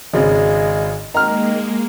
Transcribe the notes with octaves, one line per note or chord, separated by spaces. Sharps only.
G#1 C#3 G#3
D#3 G#3 A#3 A#5 F6